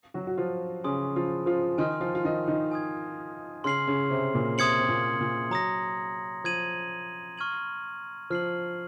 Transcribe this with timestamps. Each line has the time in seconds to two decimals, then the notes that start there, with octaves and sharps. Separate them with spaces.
0.14 F#3 F#4
0.27 F#4
0.38 F3 F4
0.84 C#3 C#4 G#5 C6 D#6
1.16 F3 F4
1.46 F3 F4
1.78 D#3 D#4 G#5 C6 F6
2.01 F3 F4
2.15 F4
2.25 D#3 D#4
2.48 D#3 D#4
2.72 G#5 D#6 G#6
3.64 C#3 C#4 C6 F6 C7 F#7
3.87 C#3 C#4
4.10 C3 C4
4.34 A#2 A#3
4.58 C3 C4 C6 D#6 G#6 C#7 F#7
4.79 C4
4.89 A#2 A#3
5.20 A#2 A#3
5.51 F#3 A#5 D#6 A#6
6.44 F3 D#6 G#6 D#7 F#7
7.38 C#6 F6 G#6 D#7 F#7
8.30 F3 F6 C7 F#7